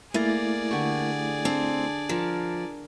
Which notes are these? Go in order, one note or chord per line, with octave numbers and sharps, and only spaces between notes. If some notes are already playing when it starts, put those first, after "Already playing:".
A3 A#3 E4 G#4 D5 A6
D3 G4 C#6
C4 D4
F3 A#4 A5